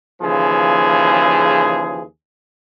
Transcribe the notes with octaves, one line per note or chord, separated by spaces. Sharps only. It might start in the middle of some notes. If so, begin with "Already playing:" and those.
D#2 C#3 E3 F3 G#4